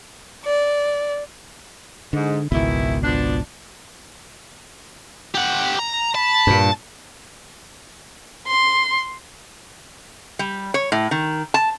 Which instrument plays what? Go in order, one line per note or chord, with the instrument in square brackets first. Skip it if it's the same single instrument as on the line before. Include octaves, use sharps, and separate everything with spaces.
[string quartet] D5
[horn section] G#2 [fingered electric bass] D3
[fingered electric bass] G#1 C#2 B2 [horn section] D#3 E3 E4
[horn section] F3 B3 D4
[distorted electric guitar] G4 F#5
A#5
[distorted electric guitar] A5 [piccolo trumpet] B5
[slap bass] G2 A#2
[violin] C6
[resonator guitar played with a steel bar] G3
C#5
A2
D#3
A5